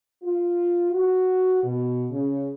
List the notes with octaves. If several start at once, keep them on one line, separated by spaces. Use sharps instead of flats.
F4
F#4
B2
C#3